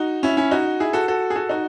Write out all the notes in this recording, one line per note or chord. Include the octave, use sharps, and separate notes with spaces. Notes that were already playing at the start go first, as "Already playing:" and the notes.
Already playing: D#4 F#4
C#4 E4
C#4 E4
D#4 F#4
E4 G#4
F#4 A4
F#4 A4
G#4
F#4 A4
D#4 F#4